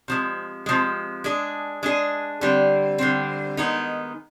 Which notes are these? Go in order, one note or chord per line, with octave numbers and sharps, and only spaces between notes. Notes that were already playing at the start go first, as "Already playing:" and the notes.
C3 F3 G#3
C3 F3 G#3
G#3 D4 G#4
G#3 D4 G#4
D3 G3 C4
D3 G3 C4
D#3 G#3 B3 D#4